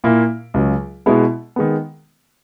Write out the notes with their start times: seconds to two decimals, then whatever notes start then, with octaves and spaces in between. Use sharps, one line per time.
0.04 A#2 A#3 E4
0.54 C#2 C#3 F#3
1.06 B2 G#3 B3 E4
1.56 D#3 G#3 B3